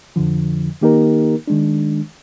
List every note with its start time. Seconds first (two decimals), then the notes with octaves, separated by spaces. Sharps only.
0.16 F2 D3 F3
0.81 D#3 A#3 D#4 G4 A#4
1.47 D#3 G#3 D4